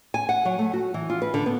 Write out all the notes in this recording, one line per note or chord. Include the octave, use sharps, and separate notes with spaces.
G#5
F#5
F#3
A3
F#4
E3
F4
B4
D3
B3